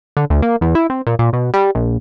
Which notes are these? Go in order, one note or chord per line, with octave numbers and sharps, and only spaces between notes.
D3
D2
A#3
E2
E4
C4
A#2
A#2
B2
G3
A#1